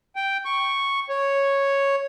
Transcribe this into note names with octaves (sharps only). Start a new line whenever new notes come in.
G5
C#6
C#5